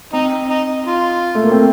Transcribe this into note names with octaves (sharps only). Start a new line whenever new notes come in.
C4 D#4
D#4
F4
A3
A#3
C4